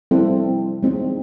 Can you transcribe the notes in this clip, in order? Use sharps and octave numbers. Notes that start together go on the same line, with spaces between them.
G3 C4 E4 A4
G#3 C4 D#4